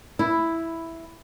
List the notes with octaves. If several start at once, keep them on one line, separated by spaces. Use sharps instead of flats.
E4